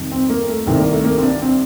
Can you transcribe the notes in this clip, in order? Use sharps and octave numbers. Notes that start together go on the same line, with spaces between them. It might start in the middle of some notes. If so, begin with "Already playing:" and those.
Already playing: F2 C3 D#3 G3
C4
A#3
A3
C2 C3 D#3 G3 C4
A#3
A3
A#3
C4
D4
C4